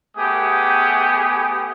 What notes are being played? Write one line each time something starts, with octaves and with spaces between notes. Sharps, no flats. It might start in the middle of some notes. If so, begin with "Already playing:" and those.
A3 B3 G4 G#4 D#6